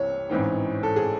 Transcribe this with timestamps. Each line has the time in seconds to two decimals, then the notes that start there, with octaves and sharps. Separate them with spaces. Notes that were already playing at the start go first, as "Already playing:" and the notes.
Already playing: C2 C3 E3 C4 C#5
0.29 A1 G#2 E3 C4 D#4
0.83 A4
0.96 G#4